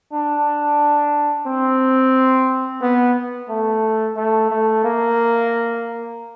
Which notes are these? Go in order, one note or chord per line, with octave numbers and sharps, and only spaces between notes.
D4
C4
B3
A3
A3
A3
A#3